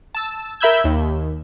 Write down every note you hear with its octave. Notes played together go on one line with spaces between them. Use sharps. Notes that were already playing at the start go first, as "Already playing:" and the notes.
A5 E6
A#4 E5 B5 E6 G6 G#6
D#2